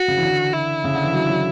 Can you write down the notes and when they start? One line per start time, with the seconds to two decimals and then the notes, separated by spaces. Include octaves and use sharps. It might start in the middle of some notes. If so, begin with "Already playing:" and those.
Already playing: F#4
0.08 C#3
0.17 E3
0.23 D3
0.53 E4
0.84 C#3
0.94 D3
1.04 E3
1.14 F#3
1.29 F#3